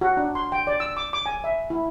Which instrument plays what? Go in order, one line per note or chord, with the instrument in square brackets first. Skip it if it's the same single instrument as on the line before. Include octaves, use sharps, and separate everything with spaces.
[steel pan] F#4
D4
C6
G5
D5
E6
D6
D6
G#5
E5
E4